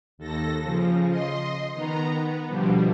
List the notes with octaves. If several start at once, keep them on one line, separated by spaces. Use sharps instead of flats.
D#2 A4 A#6
C#3 F3
D#5 C6
D#3 B3 A#5
B3
B2 D3 F3 G3